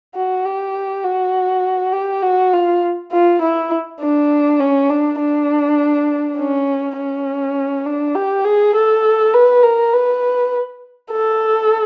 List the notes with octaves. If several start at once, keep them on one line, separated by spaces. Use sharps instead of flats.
F#4
G4
F#4
G4
F#4
F4
F4
E4
D4
C#4
D4
D4
C#4
C#4
D4
G4
G#4
A4
B4
A#4
B4
A4